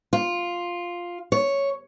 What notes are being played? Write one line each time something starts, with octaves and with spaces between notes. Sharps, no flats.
F4
C#5